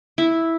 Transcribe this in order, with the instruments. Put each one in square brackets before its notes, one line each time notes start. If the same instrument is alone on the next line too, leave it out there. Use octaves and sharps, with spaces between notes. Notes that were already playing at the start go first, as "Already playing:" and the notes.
[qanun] E4